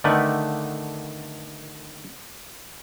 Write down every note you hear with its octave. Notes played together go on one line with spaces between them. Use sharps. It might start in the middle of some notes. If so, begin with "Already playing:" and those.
D3 D#3 A3 B3 B4 D5